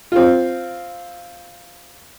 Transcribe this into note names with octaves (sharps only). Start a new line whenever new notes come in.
C4 F4